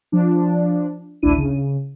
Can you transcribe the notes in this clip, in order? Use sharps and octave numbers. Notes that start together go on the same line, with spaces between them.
F3 D4
A1 D2 D4 E4 D#7
C#3